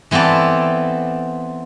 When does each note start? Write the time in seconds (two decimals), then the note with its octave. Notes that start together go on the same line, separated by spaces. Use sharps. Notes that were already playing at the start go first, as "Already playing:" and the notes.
0.11 E3 B3 C4 A4 D5